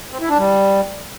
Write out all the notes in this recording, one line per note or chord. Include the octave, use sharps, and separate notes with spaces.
C4
E4
D4
G3